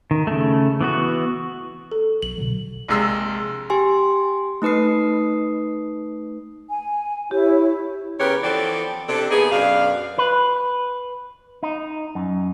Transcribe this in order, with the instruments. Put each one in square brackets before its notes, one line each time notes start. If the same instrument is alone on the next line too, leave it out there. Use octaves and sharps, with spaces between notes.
[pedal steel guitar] D#3
C#3 A3
E3 B3 F#4
[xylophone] A4
[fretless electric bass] B1 [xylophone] F#7
[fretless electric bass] B2 D3 F#3
[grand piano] A#1 C3 G#3 E6
[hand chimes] G4 G#5 C6
A3 D#4 B4 D#6 C7
[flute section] G#5
[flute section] E4 C#5 [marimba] G4
[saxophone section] C#3 B3 G4 A#4 B4 C#5
E3 F3 B3 C4 A4 D5
C3 D4 A4
A#3 B3 D#4 G#4
F#2 B2 D4 F5
[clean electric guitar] B4
D#4
F#2